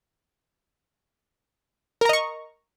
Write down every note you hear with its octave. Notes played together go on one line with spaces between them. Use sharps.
A#4 D#5 A#5 C#6